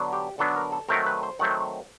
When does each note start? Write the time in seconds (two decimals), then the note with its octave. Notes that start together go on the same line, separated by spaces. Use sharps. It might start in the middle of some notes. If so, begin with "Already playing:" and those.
Already playing: D3 F#3 B3 D4
0.13 G4
0.38 D3 F#3 B3 D4 A4
0.56 A#4
0.72 A4
0.89 D#3 F#3 A3 C4 A#4
1.06 B4
1.23 C5
1.39 D#3 F#3 A3 C4 F#5